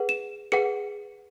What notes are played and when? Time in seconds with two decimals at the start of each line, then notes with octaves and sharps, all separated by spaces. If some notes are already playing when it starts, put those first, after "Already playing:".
Already playing: G#4 B4 F#5
0.09 E7
0.52 G#4 B4 F#5 C#7